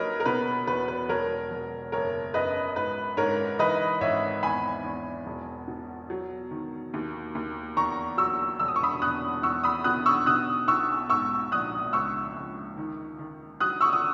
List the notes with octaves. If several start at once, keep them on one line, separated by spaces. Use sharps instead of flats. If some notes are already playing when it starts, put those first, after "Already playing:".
Already playing: D#2 F#3 A#4 B4 C#5 D#5
A#4
B2 B4
E2 B4
B4
E1 A#4 C#5
E1
F#1 A#4 C#5
F#2 B4 D#5
G#2 B4
G#2 A#4 C#5
E3 B4 D#5
G#1 C#5 E5
E2 G#5 B5
E2
E1
B2
F#3
D#3
D#2
D#2
E2 A#5 C#6
F#3 C#6 E6
E1 E6
D#6
C#6
B5 D#6
E2 D#6 F#6
E2 C#6 E6
B5 D#6
B2 D#6 F#6
C#6 E6
B2 D#6 F#6
B1 C#6 E6
G#2 C#6 E6
A#1 D#6 F#6
C#2 C#6 E6
C#2
D#3
D#3
F#3 D#6 F#6
C#6 E6
D#6